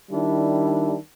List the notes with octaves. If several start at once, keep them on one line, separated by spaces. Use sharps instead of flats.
D#3 G3 D4 E4